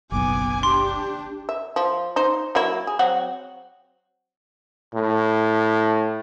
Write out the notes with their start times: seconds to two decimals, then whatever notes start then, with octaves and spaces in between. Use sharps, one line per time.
0.12 F#1 B1 B3 G#5 D6
0.63 D4 G4 C6
1.49 E5
1.76 F3
2.16 D#4 C5
2.55 F#3 A#3 E4
2.87 G#4
2.99 F#3 C4 F#4
4.94 A2